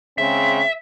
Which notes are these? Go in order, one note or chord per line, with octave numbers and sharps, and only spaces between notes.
C#3 G#3 C4 E5